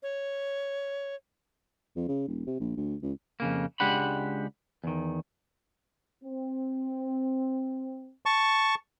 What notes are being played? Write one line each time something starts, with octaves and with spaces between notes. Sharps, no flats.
C#5
F2
C#3
E1
C3
A#1
D2
C#2
F2 C#3 A#3
C#2 G#3 D4 G4 F#5 B5
E2 D#3
C4
A5 C#6